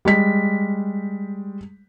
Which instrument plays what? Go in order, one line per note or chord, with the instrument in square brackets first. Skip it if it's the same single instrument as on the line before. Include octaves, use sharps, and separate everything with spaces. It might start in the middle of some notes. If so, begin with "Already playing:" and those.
[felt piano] G3 G#3 B6